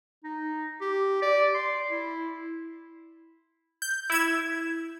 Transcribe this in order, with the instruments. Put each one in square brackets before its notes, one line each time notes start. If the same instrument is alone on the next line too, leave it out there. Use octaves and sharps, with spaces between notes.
[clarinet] D#4
G4
D5
C6
E4
[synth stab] G6
E4 G#6 E7